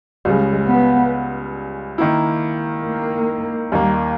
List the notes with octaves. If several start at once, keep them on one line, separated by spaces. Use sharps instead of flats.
C#2 C#3 G3 G#3
B3
D#3 A#3 E4
A#3
D#2 D#3 G3 A#3